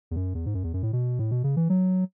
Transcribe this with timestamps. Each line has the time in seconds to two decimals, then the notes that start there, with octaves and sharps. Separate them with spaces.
0.11 E2
0.16 F#2
0.35 E2
0.46 G#2
0.54 F#2
0.64 E2
0.74 F#2
0.83 A2
0.93 B2
1.19 A2
1.31 B2
1.44 C#3
1.57 E3
1.70 F#3